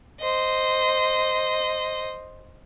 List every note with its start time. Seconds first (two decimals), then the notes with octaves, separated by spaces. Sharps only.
0.20 C5 D#5